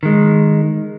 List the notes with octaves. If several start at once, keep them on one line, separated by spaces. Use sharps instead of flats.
D#3 G#3